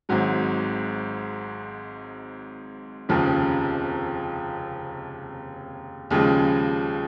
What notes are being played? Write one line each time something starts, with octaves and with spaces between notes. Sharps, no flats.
G#1 G#2 F#3
F1 D#2 C#3 F3
D#2 C#3 F3 G#3